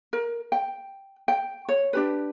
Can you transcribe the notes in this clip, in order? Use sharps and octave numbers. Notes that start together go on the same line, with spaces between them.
A#4
G5
G5
C#5
D4 G4 B4